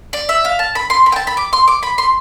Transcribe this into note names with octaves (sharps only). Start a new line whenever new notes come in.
D5
E5
F5
A5
B5
C6
B5
G5
A5
B5
D6
C6
D6
B5
C6